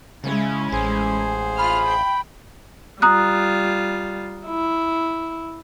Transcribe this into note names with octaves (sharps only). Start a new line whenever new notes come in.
C#3 G#3 C#4 E4
A1 G#4 C5
F4 B5 F6
G5
G3 F4 A#5 D#6 F#6
E4